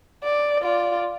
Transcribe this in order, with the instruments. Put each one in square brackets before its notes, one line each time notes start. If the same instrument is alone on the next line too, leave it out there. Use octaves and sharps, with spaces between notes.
[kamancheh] D5
F4 D5